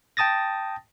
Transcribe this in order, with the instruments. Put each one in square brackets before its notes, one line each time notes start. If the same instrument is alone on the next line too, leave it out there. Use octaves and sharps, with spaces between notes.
[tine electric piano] G5 A5 D#6 A6 A#6